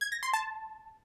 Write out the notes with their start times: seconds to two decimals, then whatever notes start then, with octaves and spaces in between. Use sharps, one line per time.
0.01 G#6
0.12 A#6
0.23 C6
0.34 A5